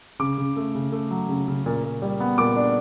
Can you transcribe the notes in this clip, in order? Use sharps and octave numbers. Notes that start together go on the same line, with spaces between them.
C#3 D6
C#3
A3
C#3
A3
F#3
C#3
C#3
A#2
A#2
G3
B3
A#2 D6
D4